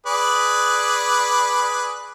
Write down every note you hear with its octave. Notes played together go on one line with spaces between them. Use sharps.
G#4 B4 D5